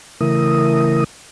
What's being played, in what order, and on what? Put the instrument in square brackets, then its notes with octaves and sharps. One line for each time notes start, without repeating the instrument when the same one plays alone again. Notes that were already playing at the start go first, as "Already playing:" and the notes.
[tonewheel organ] C#3 E3 A3 E4 A#4 D#6